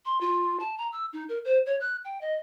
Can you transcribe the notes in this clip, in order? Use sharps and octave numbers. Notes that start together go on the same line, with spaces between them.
C6
F4
A5
A#5
E6
D#4
A#4
C5
C#5
F#6
G5
D#5